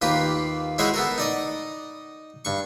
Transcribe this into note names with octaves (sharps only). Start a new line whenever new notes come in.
D#2 A#3 F4 G4 B4
G#3 E4 F#4 C5 C#5 D#5
B3 A4 A#4
D#4 D5 D#5
G2 C#6